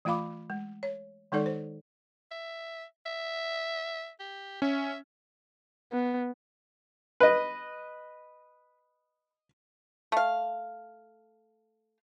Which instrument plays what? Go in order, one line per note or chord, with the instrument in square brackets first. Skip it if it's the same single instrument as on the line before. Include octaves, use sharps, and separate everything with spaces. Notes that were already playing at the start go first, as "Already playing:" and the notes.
[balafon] E3 A3 F4 F5 B5 D6
G#3
C#5
D#3 G#3 D#4 A4 D5
C5
[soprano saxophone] E5
E5
G4
[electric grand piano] C#4 [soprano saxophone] E5
[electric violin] B3
[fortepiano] B4 D#5
[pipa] A3 F5